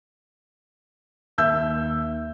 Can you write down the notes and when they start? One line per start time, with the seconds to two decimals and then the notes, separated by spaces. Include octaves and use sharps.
1.38 D#2 E5 E6 G6